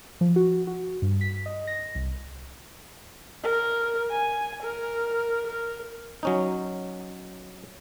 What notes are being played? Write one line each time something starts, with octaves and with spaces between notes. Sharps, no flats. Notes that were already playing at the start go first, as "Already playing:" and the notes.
F3
F#4
F#4
G2
B6
D#5
A#6
C2
A#4
G#5
A#4
A#4
F#3 C#4 D#4